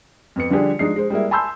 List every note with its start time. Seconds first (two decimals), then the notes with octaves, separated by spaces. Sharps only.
0.36 F2 B3 C#7
0.50 D3 F3 G3 D4 G4 G#4
0.79 F3 G#3 D4 D#4 C7
0.96 G#3 C5
1.10 G3 G#3 A#3 E4
1.31 G#5 A5 B5 C6 E6 G6